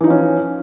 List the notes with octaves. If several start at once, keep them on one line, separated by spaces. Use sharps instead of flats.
E3 F3 C#4 D#4